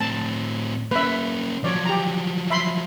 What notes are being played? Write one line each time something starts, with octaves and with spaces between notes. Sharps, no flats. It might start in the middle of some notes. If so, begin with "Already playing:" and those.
A2 C4 A5
A#3 C#4 B4 E5
F3 F#3 C#5 D5
G4 A#5
E5 B5 C6